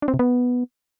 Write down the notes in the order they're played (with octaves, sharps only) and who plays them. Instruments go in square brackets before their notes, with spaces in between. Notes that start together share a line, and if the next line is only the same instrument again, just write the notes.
[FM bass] D4
C4
C3
B3